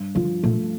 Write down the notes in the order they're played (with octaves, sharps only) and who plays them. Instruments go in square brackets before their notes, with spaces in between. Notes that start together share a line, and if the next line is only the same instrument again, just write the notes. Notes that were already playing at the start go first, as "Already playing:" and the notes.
Already playing: [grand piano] G2
[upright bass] D3 [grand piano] F3
[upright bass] A#2 [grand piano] A3